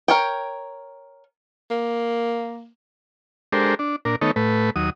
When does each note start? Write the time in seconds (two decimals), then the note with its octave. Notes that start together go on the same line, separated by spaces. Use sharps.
0.08 A#4 C#5 G5
1.71 A#3
3.53 G#3 D4 G4 A4 A#4 C5
3.79 D4
4.05 A#2 D4 A#4
4.21 D#3 A3 B3 D#4 A4 C#5
4.36 A2 A3 B4
4.76 D#2 F#3 D#6